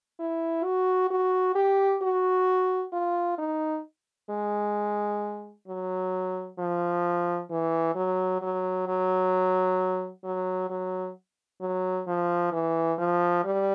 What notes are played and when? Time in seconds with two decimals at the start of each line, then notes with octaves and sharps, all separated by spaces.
0.19 E4
0.64 F#4
1.11 F#4
1.55 G4
2.02 F#4
2.93 F4
3.38 D#4
4.30 G#3
5.68 F#3
6.59 F3
7.50 E3
7.95 F#3
8.42 F#3
8.87 F#3
10.24 F#3
10.69 F#3
11.61 F#3
12.07 F3
12.52 E3
12.98 F3
13.45 G3